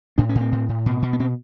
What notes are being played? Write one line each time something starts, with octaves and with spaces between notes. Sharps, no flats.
A2 D4
C#4
A2
C4
A2
A2
B2
B2
B3
B2 C4